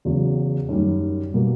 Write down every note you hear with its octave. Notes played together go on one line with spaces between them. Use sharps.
E2 C#3 F#3
F#2 D#3 G3
B2 G3 A#3